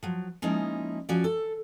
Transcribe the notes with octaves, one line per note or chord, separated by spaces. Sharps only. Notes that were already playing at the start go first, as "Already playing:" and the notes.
F3 F#3
F3 G#3 A#3 C#4 D#4 E4
F3 C#4 F#4 D5
A4